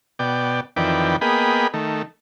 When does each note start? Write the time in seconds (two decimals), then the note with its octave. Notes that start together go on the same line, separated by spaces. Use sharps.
0.19 B2 D5 G5
0.76 F2 D#3 E3 B4 D5 G5
1.21 A#3 B3 G#4 D#5 G5 B5
1.74 D#3 A3